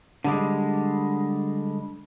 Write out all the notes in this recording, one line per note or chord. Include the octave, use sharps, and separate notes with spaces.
D3 G3 G#3